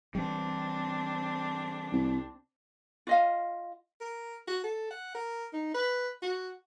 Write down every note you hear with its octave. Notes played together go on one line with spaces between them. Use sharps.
E3 G3 C4 D4
C2
F4 D#5 F5
A#4
F#4
A4
F#5
A#4
D#4
B4
F#4